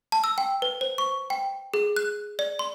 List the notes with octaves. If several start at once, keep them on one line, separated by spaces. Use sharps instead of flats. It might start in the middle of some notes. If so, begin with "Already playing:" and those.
A5
E6
G5
B4
C5
C#6
G5
G#4
F#6
D5
C6